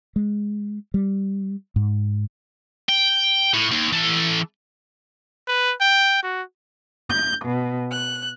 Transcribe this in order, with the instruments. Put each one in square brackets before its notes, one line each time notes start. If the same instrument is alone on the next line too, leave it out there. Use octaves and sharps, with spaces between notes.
[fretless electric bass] G#3
G3
G#2
[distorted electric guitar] G5
A2
D#2
E3 A4
[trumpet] B4
G5
F#4
[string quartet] G6
B2
F#6